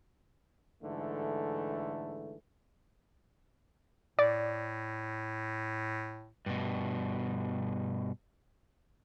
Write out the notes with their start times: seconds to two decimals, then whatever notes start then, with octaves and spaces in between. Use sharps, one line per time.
0.83 G#2 D3 E3 A3
4.19 A2 D5
6.46 G2 B2